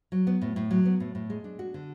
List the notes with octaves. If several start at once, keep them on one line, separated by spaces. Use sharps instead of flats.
F#3
B3
A2
A2
F#3
B3
A2
A2
G#3
D4
F#4
D3